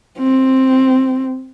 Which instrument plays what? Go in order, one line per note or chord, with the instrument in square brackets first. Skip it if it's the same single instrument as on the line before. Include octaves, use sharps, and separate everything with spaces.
[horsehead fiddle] C4